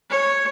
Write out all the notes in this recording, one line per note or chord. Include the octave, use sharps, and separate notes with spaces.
C#5